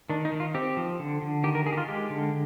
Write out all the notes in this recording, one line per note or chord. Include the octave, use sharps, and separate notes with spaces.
D#3 D4
D#4
D#3
F4
C4 G4
F3
D3
D3
D#3 G4
A#4
D#3 G#4
G4
F4
G#3 G4
D3